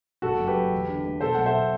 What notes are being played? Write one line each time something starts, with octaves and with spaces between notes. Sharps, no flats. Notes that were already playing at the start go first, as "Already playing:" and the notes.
F#1 F#4 A4
F#2
G4 B4
F#2
E2
D3
A3
B2 A4 C5
B1 F#5
C5 E5
B2